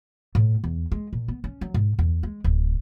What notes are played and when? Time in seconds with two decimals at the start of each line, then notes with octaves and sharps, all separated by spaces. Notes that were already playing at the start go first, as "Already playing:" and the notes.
0.35 A2
0.64 E2
0.92 G#3
1.13 A#2
1.28 B3
1.44 C#4
1.61 F#3
1.74 G#2
1.99 E2
2.23 G#3
2.44 D1